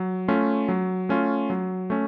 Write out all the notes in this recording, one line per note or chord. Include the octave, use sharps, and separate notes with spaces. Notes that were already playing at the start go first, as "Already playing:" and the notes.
Already playing: F#3
A3 C#4 F4
F#3
A3 C#4 F4
F#3
A3 C#4